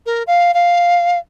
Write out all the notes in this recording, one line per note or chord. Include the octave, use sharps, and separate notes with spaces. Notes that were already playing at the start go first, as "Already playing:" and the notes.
A#4
F5
F5